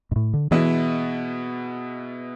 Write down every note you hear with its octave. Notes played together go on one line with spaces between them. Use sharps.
G#2
A2
D3
B2 E3 G#3 B3 E4